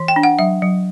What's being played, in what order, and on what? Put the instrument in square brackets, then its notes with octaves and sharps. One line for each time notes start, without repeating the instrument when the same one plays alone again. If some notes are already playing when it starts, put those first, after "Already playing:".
Already playing: [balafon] E3
G5
D4
F#5
F#3 E5
F#3